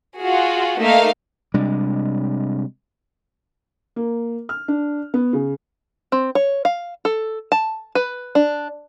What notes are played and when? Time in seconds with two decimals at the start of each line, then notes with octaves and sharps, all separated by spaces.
0.18 F4 F#4 G#4
0.80 A3 A#3 D#4 E5 F5
1.54 C3 G3 G#3 D4
3.96 A#3
4.49 F6
4.68 D4
5.14 B3
5.33 C#3
6.12 C4
6.35 C#5
6.65 F5
7.05 A4
7.52 A5
7.95 B4
8.35 D4